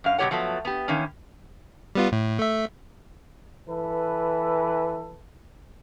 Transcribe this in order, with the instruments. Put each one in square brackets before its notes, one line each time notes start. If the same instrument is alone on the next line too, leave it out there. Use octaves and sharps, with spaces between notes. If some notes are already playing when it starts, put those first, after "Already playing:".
[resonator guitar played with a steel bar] F#2 F5
B2 F#3 G3 G4 C#5 F#5
F3 F#3 A3 B3
B3 G4
D#3 E3 A#3 C#4
[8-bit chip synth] G3 B3 F4
A2
A3 E5
[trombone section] E3 A4 B4